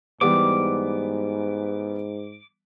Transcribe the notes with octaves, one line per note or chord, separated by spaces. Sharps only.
G#2 E3 G3 B3 D6